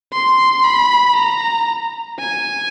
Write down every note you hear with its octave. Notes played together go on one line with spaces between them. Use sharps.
C6
B5
A#5
G#5